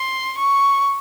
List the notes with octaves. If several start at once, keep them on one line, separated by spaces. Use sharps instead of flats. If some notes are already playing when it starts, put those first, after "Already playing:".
Already playing: C6
C#6